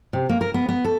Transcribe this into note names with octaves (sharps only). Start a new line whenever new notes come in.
C3
A#3
A#4
B3
B3
A4